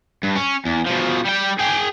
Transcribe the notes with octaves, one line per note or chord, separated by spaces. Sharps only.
G2
C#4
E2
B2 F3
G3 G5
G#4 G5